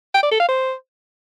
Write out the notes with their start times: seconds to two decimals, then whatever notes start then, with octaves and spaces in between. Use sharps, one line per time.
0.14 G5
0.23 D5
0.31 A4
0.40 F5
0.48 C5